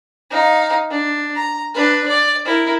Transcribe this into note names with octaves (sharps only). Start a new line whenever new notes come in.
D#4 F5
D4
A#5
D4 B4
D5
E4 A#4